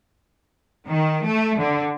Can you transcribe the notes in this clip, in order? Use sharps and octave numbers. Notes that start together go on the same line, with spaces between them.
D#3
A3
D3